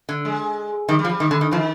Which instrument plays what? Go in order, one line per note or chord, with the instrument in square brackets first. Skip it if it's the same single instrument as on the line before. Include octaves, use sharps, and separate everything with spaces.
[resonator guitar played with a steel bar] D3
[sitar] G#3
[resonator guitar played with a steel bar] D#3 [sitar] G3
[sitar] G3
[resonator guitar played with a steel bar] F3
[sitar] G3
[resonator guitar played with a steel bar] D#3
D3
D#3
[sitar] D#3 [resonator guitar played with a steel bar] F3